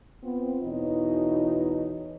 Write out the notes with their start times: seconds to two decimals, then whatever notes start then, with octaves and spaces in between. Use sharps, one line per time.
0.24 B3 C4 F4
0.63 E2 B2 E3 D#4 C#5 D#5